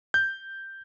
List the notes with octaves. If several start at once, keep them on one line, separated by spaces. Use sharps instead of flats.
G6